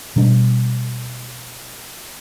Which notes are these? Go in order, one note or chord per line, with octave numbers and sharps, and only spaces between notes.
B2 G3 D4